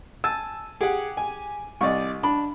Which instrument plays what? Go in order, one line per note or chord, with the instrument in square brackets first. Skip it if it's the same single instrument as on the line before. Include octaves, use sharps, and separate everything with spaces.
[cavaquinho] G#5 A5 [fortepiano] E6
[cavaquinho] G4 [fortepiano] G#4 F#5
[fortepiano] G#5
[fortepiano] C2 D#5 [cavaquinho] D5 C#6
[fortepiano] D4 [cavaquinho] B5